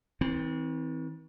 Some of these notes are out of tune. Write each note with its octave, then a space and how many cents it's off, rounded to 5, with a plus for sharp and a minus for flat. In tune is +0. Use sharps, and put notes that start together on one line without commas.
E3 -45 C4 +0